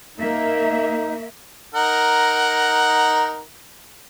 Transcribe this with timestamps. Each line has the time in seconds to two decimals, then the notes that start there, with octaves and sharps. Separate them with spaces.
0.17 A#3 D#4 E5
1.74 D#4 A#4 F#5